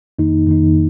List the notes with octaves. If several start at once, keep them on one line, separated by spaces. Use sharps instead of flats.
F2 D#3 A#3 D#4
F2 D#3 A#3 D#4